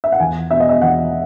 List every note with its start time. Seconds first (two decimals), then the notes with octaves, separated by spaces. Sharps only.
0.04 E5
0.12 F#5
0.20 E2 G#5
0.51 B2 E5
0.60 D#5
0.69 E5
0.82 E2 F#5